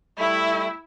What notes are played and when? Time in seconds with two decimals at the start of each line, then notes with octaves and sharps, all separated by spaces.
0.18 G3 A3 E4 B5